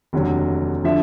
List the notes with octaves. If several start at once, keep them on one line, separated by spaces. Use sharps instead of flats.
F1 D#2 D3 F#3
D3 F3 E5